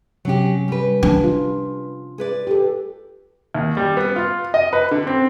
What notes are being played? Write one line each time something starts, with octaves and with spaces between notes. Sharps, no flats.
C3 F#3 C#4 G4
G3 B4
D4
F4
G#4 B4 D5
G4 A4
D#2
G3
B3
F4
D#5
B4
D3
C4